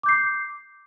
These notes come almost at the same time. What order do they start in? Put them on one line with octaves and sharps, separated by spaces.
D6 G6 C7